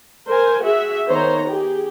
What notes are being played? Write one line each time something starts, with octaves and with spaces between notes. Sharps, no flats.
A#4 C5 G#5
F#4 G#4 E5
D#3 B3 C5 C#5 A#5
G4 G#4